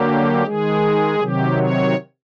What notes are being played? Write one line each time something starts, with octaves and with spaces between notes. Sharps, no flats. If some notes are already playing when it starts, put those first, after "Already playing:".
Already playing: D3 F#3 A#3 G4
D#3 G#3 G#4
C3 D#3 F#3 G4
C#5